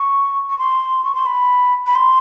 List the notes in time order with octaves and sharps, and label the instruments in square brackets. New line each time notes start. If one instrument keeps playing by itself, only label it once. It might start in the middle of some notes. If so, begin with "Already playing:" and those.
Already playing: [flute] C#6
C#6
C6
C#6
C6
B5
B5
C6